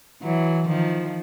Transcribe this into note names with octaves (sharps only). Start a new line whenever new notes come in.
E3 F#3
D#3 F3